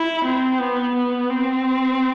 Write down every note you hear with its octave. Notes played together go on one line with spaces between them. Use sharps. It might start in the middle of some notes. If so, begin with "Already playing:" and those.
Already playing: E4
C4
B3
B3
C4